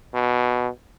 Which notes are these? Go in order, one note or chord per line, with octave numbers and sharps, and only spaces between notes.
B2